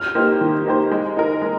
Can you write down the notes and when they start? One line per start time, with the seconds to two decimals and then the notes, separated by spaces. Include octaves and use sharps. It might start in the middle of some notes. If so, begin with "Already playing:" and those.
Already playing: F6
0.15 A#3 D#4 G4 C5
0.41 D#3
0.66 A#3 D#4 G4 C5
0.91 G#3
1.17 D#4 A#4
1.42 G#3